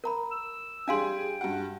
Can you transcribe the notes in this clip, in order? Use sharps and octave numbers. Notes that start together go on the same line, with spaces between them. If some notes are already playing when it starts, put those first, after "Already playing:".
A#4 A#5 B5
E6
G3 D4 G#4 F5 G5 G#5 C6
G2 F#4 F#5